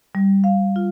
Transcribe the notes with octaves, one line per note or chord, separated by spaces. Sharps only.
G3
F5
F4